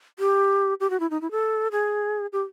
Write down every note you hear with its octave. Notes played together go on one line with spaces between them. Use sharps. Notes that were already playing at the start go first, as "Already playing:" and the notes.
G4
G4
F#4
E4
D#4
E4
A4
G#4
G4